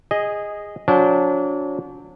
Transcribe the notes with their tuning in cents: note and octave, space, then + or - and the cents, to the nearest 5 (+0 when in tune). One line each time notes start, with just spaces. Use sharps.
G#4 -15 D#5 +0
F#3 -35 D4 -35 G5 +0